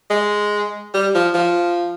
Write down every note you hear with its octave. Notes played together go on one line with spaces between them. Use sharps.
G#3
G3
F3
F3